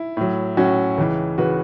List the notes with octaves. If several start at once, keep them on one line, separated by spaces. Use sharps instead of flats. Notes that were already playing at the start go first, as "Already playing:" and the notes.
Already playing: E4
A2 F#3
A2 F#3 C#4 F#4
C#2 C#3 E3
C#3 E3 F#4 B4